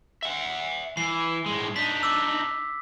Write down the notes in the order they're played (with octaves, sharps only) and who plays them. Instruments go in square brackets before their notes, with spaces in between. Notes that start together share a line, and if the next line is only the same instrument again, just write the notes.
[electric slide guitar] E5 F#5
[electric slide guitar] E3 [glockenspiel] C7
[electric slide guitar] A2 G#3
[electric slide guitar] D4 D#4 [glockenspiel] B6
[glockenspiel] D6 E6